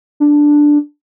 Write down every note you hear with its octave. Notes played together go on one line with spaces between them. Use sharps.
D4